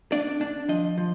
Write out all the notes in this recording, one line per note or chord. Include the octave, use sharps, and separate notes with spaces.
D4 D5
D4
F3 D#5
F3